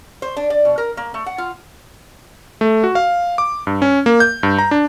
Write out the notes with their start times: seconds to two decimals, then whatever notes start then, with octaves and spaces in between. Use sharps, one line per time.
0.22 C5
0.37 D4
0.50 D5
0.65 B2
0.78 A#4
0.97 A#3
1.14 A3
1.26 F#5
1.38 F4
2.61 A3
2.84 F#4
2.95 F5
3.38 D6
3.67 G2
3.82 C#4
4.06 A#3
4.20 G6
4.43 G2
4.59 A#5
4.71 D4